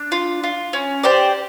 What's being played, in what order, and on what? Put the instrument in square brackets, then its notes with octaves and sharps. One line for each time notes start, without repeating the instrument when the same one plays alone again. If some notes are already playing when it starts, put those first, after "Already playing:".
Already playing: [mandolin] D4
F4
F4
C#4
G4 C5 D5